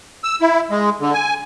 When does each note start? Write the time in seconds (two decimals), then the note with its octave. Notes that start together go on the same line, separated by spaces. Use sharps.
0.24 E6
0.41 E4
0.71 G#3
1.01 D3
1.14 G#5